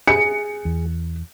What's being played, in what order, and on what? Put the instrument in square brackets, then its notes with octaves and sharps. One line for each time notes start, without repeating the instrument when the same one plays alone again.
[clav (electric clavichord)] G#4 [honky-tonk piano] C#7
[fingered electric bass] E2